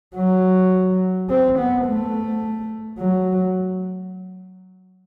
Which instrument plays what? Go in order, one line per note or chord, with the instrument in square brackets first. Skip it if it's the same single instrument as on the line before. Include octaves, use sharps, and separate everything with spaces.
[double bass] F#3
C4
B3
A3
F#3